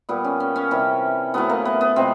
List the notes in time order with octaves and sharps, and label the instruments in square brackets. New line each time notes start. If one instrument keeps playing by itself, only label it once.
[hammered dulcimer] A#2 G3 B3
C#4
C#4
C#4
C3 E3 G3
A2 F#3 A3 B3
A#3
B3
B3
C3 F3 G#3 C4